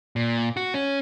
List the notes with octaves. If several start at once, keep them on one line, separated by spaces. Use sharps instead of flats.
A#2
F#4
C#4